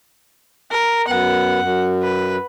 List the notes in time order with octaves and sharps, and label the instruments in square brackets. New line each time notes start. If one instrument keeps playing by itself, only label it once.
[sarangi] A#4
[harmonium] F#2 B3 [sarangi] F#5
[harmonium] F#2
[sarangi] B4